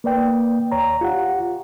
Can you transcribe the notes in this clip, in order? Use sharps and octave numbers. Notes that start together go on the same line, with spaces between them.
A#3 B4 D5 G5
D#2 C#5 A#5
F4 G4 F#5